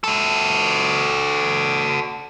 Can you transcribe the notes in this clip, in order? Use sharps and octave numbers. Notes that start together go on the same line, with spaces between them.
F#4 A4